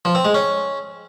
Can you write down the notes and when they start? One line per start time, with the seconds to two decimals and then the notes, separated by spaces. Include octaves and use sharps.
0.05 F3
0.15 C4
0.25 G#3
0.34 C#4